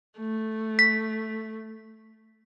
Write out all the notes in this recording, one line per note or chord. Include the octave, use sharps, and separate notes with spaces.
A3
B6